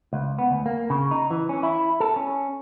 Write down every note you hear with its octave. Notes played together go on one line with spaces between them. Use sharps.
C#2
B3
D2
A#3
C#3
D#4
E3
C#4
E4
A4
C#4